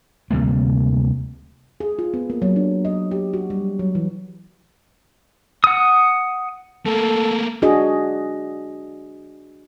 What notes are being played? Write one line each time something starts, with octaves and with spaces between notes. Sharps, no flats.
D2 C3 G3 A#3
G#4
F4
B3
A#3
F#3
D4
D#5
G4
F#4
G3
F#3
E3
F#5 D#6
A3 A#3 A4
D4 F#4 G#4 D#5